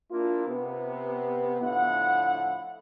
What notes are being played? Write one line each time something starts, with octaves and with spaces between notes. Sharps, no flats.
A#3 D4 E4 F4
C3 B3
A2 D3 F3 E4 F#5